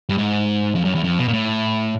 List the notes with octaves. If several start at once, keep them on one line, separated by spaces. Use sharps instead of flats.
G2
G#2
F2
F#2
E2
F2
B2
A#2
A2